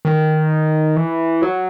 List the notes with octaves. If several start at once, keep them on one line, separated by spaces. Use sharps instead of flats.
D#3
E3
F#3